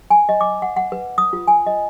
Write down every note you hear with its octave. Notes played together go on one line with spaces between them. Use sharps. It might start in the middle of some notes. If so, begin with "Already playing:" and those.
G#5
D#5
D6
F#5
F#5
B4
D#6
F4
G#5
D#5